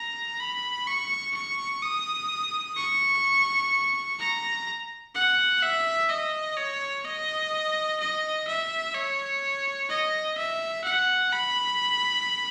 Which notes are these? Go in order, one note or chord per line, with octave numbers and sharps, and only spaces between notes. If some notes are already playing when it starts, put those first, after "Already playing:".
Already playing: A#5
B5
C#6
C#6
D#6
C#6
A#5
F#5
E5
D#5
C#5
D#5
D#5
E5
C#5
D#5
E5
F#5
B5